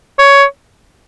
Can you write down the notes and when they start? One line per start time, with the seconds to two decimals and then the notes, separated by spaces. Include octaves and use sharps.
0.19 C#5